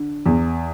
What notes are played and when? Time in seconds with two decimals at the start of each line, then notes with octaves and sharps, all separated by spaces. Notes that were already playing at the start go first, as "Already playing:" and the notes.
Already playing: D3
0.26 E2